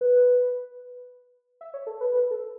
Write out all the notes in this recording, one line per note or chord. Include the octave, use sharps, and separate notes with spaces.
B4
E5
C#5
A4
B4
B4
A4